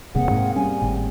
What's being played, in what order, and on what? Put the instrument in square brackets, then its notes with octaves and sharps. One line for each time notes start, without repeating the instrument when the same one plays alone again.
[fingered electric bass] D#1 C3 [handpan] A#3 C4 G#4 [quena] F#5
[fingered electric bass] G#2 [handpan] C4
[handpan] G3 [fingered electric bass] C#4 [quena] G#5
[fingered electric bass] G#1 A2